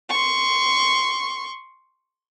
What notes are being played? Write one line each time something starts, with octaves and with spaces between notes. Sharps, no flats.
C6 C#6